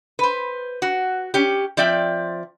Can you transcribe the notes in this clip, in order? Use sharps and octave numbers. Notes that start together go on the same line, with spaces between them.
B4 C5
F#4
C#4 G4
F3 C4 D5 E5 G5